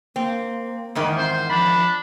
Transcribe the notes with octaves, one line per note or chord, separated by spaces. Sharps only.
A#3 C4
E2 G#2 D#3
C4 C5
F3 D4 B5